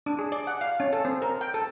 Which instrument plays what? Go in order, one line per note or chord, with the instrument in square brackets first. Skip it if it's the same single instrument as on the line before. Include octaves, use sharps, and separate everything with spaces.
[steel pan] D4
G#4
D5
F#5
F5
C#4
A4
C4
A#4
G5
A4